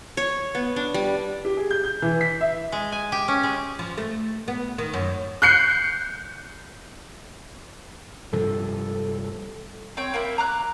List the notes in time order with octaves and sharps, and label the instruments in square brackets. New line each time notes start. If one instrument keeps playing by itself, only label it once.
[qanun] C#5
B3
D4
G3
[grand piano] G4
G#4
G6
G6
E3
B6
E5
[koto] G#3
G#5
G4
C#4
G#3
[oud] F3
A3
B3
D#3
F#2
[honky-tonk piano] F#6 G6 C7 C#7
[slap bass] G2 C3 F3 [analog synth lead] A4
[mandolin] C4 C#5 G5
A#3 C4 E4
A#5 D6 F#6